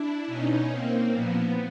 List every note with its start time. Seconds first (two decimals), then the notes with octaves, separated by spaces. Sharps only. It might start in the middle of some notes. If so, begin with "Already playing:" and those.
Already playing: D4 E4
0.27 B2 C#4 D#4
0.70 A#3 C4
1.12 A#2 F3 B3